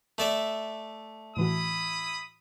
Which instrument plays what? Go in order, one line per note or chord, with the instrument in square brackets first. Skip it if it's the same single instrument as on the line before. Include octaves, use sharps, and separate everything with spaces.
[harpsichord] A3 D5 E5
[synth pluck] A2 E3 F#4 [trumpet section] E4 B5 D#6